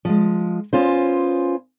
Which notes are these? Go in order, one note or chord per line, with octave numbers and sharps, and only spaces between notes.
F3 G#3
B3 C#4 F4 C5